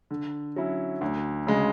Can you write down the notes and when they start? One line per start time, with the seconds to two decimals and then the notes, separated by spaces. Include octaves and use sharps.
0.11 D3
0.56 F#3 C#4 E4
1.01 D2
1.47 C#3 G#3